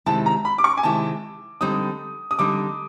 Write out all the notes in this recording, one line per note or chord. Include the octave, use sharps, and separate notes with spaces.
C3 D#3 G#3 C4 E4 A5
A#5
B5
D6
C#6
G#5
C3 D#3 G#3 C4 E4 A5
D3 G3 C4 D#4 D#6
D#6
D3 G3 C4 D#4 D6